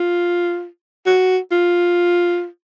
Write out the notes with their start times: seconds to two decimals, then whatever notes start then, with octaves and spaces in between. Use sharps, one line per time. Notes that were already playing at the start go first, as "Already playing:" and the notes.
Already playing: F4
1.06 F#4
1.52 F4